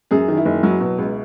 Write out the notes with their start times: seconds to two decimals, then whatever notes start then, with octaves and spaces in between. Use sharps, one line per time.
0.11 F#2 G#4
0.28 D#3
0.37 E4
0.45 F#1
0.63 F#3
0.81 B2
0.98 C#2